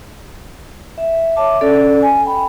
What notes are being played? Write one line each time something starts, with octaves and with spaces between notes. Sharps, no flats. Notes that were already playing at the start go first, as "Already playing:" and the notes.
E5
C#5 E5 A5 D6
C#4 A4 D5
G#5
G5 B5